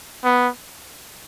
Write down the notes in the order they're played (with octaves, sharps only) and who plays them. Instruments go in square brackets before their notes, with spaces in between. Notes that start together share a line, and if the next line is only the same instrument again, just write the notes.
[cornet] B3